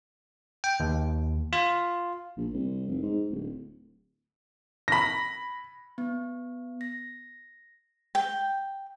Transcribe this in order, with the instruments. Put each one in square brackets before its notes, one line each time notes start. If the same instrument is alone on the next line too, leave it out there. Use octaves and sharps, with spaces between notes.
[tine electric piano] G5
D#2
F4
[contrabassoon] A#1
C2
F1
G#2
D1
[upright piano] B5 A#6
[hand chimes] B3
A#6
[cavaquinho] G5